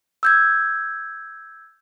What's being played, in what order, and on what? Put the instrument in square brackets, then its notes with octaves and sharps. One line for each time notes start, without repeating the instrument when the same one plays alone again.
[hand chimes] E6 G6 G#6